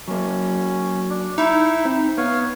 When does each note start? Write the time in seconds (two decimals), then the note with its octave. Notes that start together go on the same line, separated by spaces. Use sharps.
0.08 F#3 A#3 C#4
1.10 D4
1.38 D#4 E4 E5
1.85 C4
2.18 B3 C#5 F5